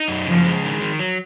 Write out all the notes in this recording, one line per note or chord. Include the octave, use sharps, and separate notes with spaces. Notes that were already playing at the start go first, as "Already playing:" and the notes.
Already playing: D#4
F#2
C#3 F3
G#3
D#3
D#3
F#3